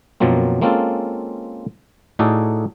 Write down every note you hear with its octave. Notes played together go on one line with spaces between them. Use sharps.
F#2 B2 F3 F#3 A#3 C4
G#3 A#3 C4 C#4 F4 A4
A2 D#4 F#4 G#4 A4 D5